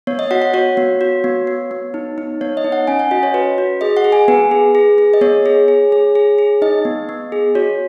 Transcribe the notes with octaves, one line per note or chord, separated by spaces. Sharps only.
B3 C#5
D#5
F#4 F#5
F#5
F#4 C#5
B3
F#4
B3
B3
B3
D#4
D#4
B3 C#5
D#5
D#4
F#5
C#4 G#5
F#5
F#4 D#5
C#5
F#4 B4
F#4
G#4 D#5
F#5
G#4
G#5
B3 B4
G#4
G#4
G#4
D#5
B3 C#5
G#4
G#4
G#4
G#4
G#4
D#4 D#5
B3
B3
G#4
F#4 C#5